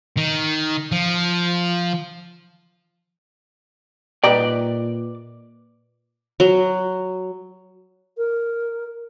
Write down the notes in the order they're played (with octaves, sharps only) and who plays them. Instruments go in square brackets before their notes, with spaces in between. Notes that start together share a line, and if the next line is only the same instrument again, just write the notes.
[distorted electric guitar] D#3
F3
[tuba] A#2 [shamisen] G3 D#4 [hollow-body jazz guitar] B4 G5 [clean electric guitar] D5
[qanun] F#3
[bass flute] A#4